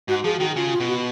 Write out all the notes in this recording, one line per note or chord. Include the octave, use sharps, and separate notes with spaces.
G#2 F#4
F3 G#4
D#3 F#4
C#3 F4
F4
B2
F#4